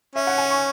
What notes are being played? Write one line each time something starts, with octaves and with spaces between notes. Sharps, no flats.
C#4 E5
F#5
G#5
C#6